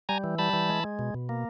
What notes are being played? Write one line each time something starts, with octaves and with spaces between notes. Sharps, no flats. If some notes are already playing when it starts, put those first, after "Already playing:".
G3 G#5 A#5
E3
G3 A5 B5
E3
G#3
G#3
B2
B2
A#3